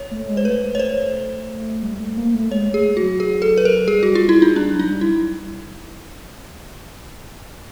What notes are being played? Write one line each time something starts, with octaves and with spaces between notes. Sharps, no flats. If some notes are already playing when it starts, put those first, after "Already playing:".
Already playing: C#5
A3
G#3
C5
A3 B4
C#5
C5
G3
A3
A#3
A3
G#3 C#5
A3
G#4
F#4
F#3
G#4
A4
B4
A#4
G3 G#4
F#4
F4
G3
E4
D#4
G3 D4
F#3
D#4
G3
E4